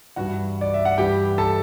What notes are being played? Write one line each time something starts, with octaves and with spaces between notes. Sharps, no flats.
G2 E3 F#4 F#5
D5
E5
F#5
G2 E3 G4 G5
A4 A5